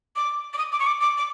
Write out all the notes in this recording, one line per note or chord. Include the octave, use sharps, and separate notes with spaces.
D6
D6
D#6
D6
C#6
D6
D6
D6